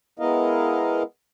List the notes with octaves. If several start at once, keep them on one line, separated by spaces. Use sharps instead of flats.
G#3 B3 E4 A#4 D#5 F5